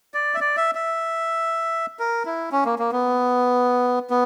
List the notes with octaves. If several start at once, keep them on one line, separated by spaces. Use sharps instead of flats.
D5
E5
D5
E5
E5
A#4
E4
C#4
A#3
A#3
B3
B3